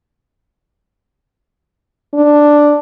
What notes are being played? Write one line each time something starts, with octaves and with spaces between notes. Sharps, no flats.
D4